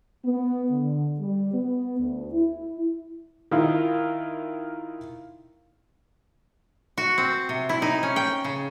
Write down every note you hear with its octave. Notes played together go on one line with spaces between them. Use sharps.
B3
D3
G3
B3
D2
E4
D#3 E4 F4 A#4
F#4
C4
C3
E4
D#4
C#4
G5
C#3